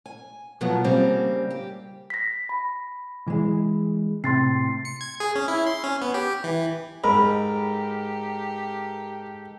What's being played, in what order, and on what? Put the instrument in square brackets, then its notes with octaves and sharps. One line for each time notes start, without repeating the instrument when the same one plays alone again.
[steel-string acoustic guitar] G#5
B2 F3 F#3 B3
C#3 G3 A#3 C4
G4
[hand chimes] A#6 B6
B5
[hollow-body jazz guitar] E3 G#3
[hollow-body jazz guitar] A2 C3 [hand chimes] C6 A6 C7
[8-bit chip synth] C#7
G#6
G#4
C#4
E4
C6
C#4
B3
G4
E3
[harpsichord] G#2 [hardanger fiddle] G4 A4 [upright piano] A#4 [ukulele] B5